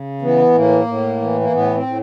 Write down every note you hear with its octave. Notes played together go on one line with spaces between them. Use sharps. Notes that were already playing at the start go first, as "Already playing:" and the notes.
Already playing: C#3
E3 B3
A2 A#3
A2
E3
A#3
A2 B3
C4
A2